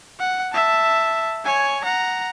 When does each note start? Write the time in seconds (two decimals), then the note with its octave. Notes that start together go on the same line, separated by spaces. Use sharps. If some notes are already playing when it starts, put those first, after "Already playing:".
0.20 F#5
0.53 E5 A5
1.45 C#5 G#5
1.84 F#5 A#5